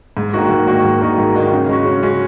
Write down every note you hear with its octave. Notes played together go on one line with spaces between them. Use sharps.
G#2
D#3 A#3 D#4 F#4
G#2
D#3 A#3 D#4 F#4
G#2
D#3 A#3 D#4 F#4
G#2
D#3 A#3 D#4 F#4
C#3
G#3 C#4 F#4
C#3
G#3 C#4 F#4